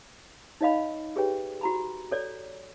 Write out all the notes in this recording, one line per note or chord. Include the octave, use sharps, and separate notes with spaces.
D#4 C#5 D#5 F5 B5
G4 G#4 B4 C#5 G5
F#4 A#5 B5
A4 C#5 D5